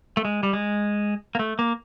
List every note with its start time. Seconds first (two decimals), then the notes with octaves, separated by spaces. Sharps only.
0.17 A3
0.25 G#3
0.43 G3
0.53 G#3
1.35 A#3
1.39 A3
1.59 A#3